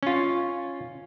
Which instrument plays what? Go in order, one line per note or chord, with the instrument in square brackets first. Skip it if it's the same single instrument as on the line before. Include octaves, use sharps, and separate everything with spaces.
[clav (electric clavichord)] C#4 F4